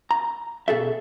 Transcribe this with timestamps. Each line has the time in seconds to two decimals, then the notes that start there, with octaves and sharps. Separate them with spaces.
0.11 A#5
0.68 B2 G#4 A4 E5